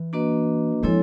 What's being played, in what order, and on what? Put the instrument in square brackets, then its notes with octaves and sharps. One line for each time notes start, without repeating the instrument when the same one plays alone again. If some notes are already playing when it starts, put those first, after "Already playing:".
Already playing: [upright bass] E3
[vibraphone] A#3 D4 F#4 B4 D#5
[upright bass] F3 [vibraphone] G#3 C4 E4 A4 C#5